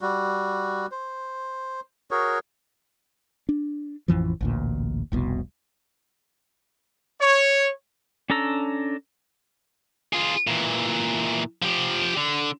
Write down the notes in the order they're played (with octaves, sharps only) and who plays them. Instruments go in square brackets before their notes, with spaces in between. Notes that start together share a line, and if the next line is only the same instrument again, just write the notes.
[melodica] G3 F#4
C5
F#4 G#4 A#4 C#5
[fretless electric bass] D4
A1 F2 E3 F3
A1 D2 A#2
F1 C2 B2
[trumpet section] C#5
[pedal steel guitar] C#4 D4 A4 A#5 E6
[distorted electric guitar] F4 G#4
A#2 E3
F3 G4
D3